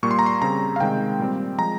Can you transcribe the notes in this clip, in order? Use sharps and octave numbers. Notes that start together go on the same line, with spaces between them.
A#2 G3 A#3 C#6
C6
A#5
C6
C#3 G3 C4 A#5
F5
C3 D#3 G#3 C4 G5
A#2 G3 C4
F3 G#3 A#5